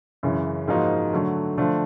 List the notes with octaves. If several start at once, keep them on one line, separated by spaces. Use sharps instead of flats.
F#2 C#3 E3
G#2 F3 A#3 D#4 F#4
D3 F#3 A3
D3 F3 A3 D4